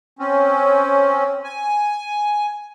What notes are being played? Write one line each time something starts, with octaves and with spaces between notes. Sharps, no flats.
C4 C#4
G#5